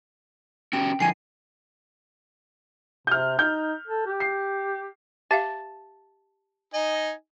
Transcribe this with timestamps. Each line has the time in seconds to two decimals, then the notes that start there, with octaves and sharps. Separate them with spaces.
0.73 C#4 F#4 G4 G5
1.00 D3 F3 G#5 C7 D#7
3.07 C3 F6 G6
3.39 D#4 G6
3.87 A4
4.07 G4
4.20 C7
5.31 G4 E5 F5 A5
6.74 D#4 D#5 G#5